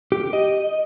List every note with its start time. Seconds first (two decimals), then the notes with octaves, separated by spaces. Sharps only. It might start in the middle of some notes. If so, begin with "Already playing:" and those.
0.12 G4
0.33 D#5